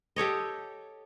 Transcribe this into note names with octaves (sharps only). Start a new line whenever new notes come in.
G4 A4 C#5 D#5